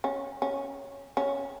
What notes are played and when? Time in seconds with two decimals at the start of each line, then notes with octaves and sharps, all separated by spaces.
0.04 C#4
0.42 C#4
1.17 C#4